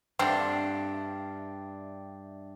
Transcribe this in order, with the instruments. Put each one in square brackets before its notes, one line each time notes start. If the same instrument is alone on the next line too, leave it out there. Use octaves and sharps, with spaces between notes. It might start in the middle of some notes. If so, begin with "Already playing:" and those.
[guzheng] G2 [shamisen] D3 C4 [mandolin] D4 F5 [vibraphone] E5 G5